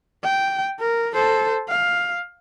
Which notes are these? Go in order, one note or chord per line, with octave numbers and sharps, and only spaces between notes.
G5
A#4
A4 C5
F5